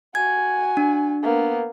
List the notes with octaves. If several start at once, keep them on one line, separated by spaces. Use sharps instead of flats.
F#4 G#5 G#6
D4
A#3 B3